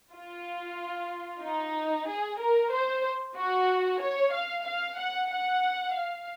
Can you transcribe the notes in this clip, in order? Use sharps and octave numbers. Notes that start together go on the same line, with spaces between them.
F4
D#4
G#4
A#4
C5
F#4
C#5
F5
F5
F#5
F#5
F5